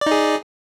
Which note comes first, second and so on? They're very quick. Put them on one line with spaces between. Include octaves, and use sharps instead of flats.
D5 D#4 G#4